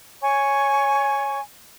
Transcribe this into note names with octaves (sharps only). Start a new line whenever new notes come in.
C#5 G#5 C#6